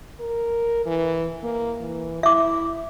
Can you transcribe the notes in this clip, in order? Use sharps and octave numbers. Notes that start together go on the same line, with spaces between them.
A#4
E3
A#3
E3
E4 E5 D6